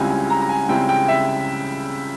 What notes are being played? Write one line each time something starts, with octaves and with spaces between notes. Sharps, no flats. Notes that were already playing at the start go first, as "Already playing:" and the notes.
Already playing: C#2 C#3 G3 C4 E4 G#5
G#5
A#5
A#5
G#5
C#2 C#3 G3 C4 E4 G5
G5
E5